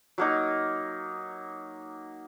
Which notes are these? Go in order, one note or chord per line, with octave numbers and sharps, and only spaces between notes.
F#3 A#3 D#4